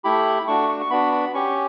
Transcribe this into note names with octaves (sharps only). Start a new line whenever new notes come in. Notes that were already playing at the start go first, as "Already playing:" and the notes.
A3 E4 G4 B5
A3 D4 F#4 C#6
C#6
C#6
B3 D4 F#4 B5
B5
C#4 G4 C#6